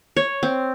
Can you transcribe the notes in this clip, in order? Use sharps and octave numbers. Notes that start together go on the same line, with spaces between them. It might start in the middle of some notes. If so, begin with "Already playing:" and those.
C#5
C4